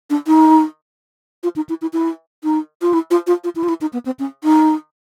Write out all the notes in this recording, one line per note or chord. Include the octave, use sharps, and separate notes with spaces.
D4
D#4
F4
D#4
E4
E4
E4
D#4
F4
E4
F4
F4
F4
E4
F4
E4
D#4
B3
C4
C#4
D#4